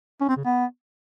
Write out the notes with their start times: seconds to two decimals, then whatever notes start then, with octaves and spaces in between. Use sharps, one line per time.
0.21 C#4
0.29 C4
0.37 C#3
0.45 B3